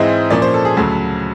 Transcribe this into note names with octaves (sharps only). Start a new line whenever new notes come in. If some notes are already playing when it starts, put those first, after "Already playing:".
Already playing: G#2 E3 G#3 C4 E4 D#5
A#2 F3 A#3 C#4 D5
C5
A4
G#4
D2 C#3 F#3 A4